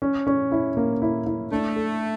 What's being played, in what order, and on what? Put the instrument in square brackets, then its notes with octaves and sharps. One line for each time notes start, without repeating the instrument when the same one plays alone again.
[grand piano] C#4
C#4
E4
A#3
E4
E4
[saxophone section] A3 [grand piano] D4
[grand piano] A4